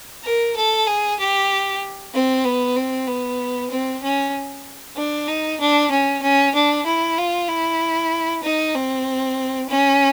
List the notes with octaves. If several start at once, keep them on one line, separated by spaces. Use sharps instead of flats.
A#4
A4
G#4
G4
C4
B3
C4
B3
C4
C#4
D4
D#4
D4
C#4
C#4
D4
E4
F4
E4
D#4
C4
C#4